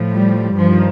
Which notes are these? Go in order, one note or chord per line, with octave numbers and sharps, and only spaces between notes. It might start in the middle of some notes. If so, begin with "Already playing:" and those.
Already playing: A2 F3
G3
G2 D#3 F3